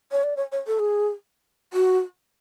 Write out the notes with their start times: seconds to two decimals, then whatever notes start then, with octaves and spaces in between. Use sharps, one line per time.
0.12 C#5
0.24 D5
0.37 C#5
0.52 C#5
0.67 A4
0.79 G#4
1.73 F#4